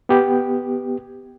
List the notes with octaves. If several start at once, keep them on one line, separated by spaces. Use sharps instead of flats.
B3 G4